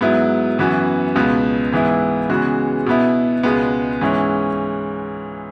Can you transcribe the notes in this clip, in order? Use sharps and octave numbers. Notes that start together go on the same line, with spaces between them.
G#2 F#3 B3 E4
F#2 E3 B3 F#4
C#2 B2 B3
G#2 E3 B3 E4
C#3 E3 G#3 B3 F#4
B2 B3 E4
C#2 B2 G#3 B3
G#2 E3 C#4 E4